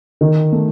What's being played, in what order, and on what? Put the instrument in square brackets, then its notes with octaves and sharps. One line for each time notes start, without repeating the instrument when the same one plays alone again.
[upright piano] D#3
A3